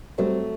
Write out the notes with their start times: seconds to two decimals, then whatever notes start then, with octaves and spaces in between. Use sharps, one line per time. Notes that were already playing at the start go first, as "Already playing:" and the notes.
0.18 F#3 G3 A3 C4 F#4 C5